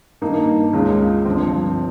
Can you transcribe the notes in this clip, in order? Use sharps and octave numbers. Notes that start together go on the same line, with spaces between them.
G2 D#3 A#3 D#4
C#2 C#3 G#3
G1 G2 F3 C4